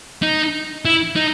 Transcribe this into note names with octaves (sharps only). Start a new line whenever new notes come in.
D#4
E4
D#4